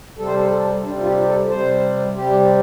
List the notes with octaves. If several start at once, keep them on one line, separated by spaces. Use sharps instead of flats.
C3 G3 A4
C5
A4
C3 G3 D4
F4
G4
A4
C3 G3 C5
C3 G3 G4